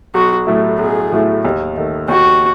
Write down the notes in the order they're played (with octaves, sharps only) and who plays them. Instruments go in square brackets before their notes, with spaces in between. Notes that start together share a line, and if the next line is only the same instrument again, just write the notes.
[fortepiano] B1 [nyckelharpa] F#4
[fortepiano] A2 F#3 A3 E4
[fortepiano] B1 [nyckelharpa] G#4
[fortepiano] A2 F#3 A3 E4
D#2
D#3 A3
[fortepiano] D#2 [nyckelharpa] F#4